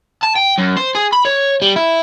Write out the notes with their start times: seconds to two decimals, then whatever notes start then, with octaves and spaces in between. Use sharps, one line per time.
0.23 A5
0.36 G5
0.58 F#2
0.77 C5
0.95 G#4
1.12 B5
1.25 C#5
1.62 G3
1.76 E4